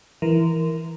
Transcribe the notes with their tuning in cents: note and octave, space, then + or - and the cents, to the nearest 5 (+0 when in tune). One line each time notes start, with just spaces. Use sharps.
E3 +0 A#4 +0 C6 -20